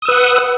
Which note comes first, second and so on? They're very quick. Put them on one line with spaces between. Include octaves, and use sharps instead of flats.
D#6 E6 B4 F#5